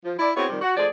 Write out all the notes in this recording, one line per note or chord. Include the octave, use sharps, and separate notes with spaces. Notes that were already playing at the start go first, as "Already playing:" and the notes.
F3
E4 D5
B3 C4 E4 F#4 G#4 C#5
C3 D#3 F3 G3
F#4
F3 A3 C4 G#4 D5